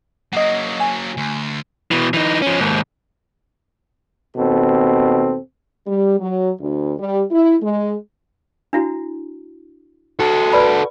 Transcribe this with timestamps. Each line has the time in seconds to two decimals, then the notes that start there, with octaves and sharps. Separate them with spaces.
0.33 F#3 A#3 D#5 F#5
0.80 G#5
1.17 D2
1.91 B2 E3
2.14 E3 D#4
2.42 F3 C#4
2.59 D#2 G#2
4.36 D#2 B2 C4 A4
5.87 G3
6.19 F#3
6.60 D2
6.98 G3
7.30 E4
7.62 G#3
8.73 D4 E4 F#4
10.19 F#4 A4
10.53 B4 D5 B5